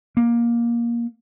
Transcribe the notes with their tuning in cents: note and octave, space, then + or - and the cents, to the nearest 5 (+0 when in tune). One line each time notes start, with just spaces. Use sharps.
A#3 +15